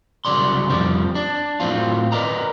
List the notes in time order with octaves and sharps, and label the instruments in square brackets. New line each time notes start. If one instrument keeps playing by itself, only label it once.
[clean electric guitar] C2 C#3 F#3 D5 C6
F2 F3 G3 C4
D4
A2 F#3 C4 F4
A#4 B4 D5 D#5 A#5